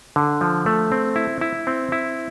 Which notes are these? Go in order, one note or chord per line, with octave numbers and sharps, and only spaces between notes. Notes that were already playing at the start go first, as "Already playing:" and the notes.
D3
F3
A3
C4
E4
E4
C4
E4